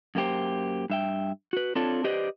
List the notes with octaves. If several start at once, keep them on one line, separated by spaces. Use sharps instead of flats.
F#2 A#3 G4 C5
G2 E5 G5
F#4 B4
C4 D4 F4 A4 C#5
G4 B4 C5 D5 D#5